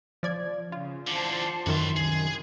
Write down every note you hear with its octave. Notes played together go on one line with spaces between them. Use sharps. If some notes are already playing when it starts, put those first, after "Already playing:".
F3 D5 G#6
C#3 F4
E2 D3 C5 D5 A5
F#2 D#3 E3 F#4 A5 C6
C2 G#4